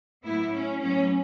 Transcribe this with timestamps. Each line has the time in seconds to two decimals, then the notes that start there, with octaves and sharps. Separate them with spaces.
0.24 A2 F#3 B3 E4
0.53 C#4
0.81 A2 F#3 B3 C#4